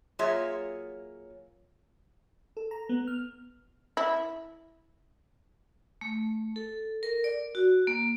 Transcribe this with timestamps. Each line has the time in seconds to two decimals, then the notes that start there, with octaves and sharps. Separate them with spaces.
0.19 F#3 A#3 F4 G#4 C#5 E5
2.57 A4
2.71 A#5
2.89 B3
3.07 F6
3.97 E4
6.01 A3
6.56 A4
7.03 A#4
7.24 D5
7.55 F#4
7.87 A#3